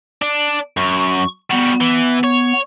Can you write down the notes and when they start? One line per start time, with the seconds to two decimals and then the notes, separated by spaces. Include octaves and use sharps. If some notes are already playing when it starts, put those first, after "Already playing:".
0.22 D4
0.77 F#2 C#6
1.51 G3 B3 F#4
1.81 E3
2.24 C#5